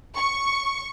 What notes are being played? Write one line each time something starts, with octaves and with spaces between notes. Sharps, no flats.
C#6